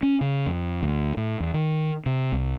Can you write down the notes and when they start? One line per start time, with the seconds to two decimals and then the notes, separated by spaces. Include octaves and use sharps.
0.03 C#4
0.21 C#3
0.46 F2
0.83 D2
1.17 A2
1.40 E2
1.54 D#3
2.06 C3
2.32 C2